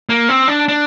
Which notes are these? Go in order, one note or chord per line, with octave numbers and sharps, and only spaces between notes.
A#3
C4
D4
D4